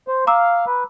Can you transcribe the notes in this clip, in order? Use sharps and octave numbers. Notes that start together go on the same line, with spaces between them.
C5
F5 A#5 D6 E6
B4